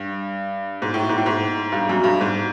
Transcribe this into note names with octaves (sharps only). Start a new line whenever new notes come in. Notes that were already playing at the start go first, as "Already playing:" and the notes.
Already playing: G2
G#2
A2
G#2
A2
G#2
G2
F#2
G2
G#2